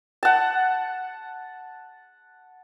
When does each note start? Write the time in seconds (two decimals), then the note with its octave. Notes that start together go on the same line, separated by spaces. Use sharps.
0.23 F#5 A5